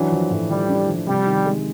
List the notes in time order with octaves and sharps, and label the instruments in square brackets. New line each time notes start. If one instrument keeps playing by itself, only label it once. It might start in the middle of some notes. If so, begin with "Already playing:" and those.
Already playing: [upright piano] E3 D4 [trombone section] F#3
[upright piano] F3
A2
[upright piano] F3 [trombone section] G3
[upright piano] D4
F3
[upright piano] C3 [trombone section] G3
[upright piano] D#3
G#3